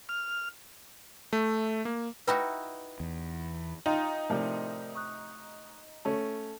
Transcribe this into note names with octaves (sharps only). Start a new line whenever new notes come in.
F6
A3
A#3
D#4 E4 F#4 B4 G5 B5
E2
D#4 F4 G5 A#5
A2 C3 F3 A#4 D5
C#6 D#6 F#6
A3 C#4 A4 A5